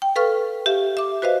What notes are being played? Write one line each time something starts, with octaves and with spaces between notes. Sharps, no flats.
G5
A4 B4 F5 C#6 F6
G4 E5 F5
E5 D6
F#4 B4 C5 D#5 F5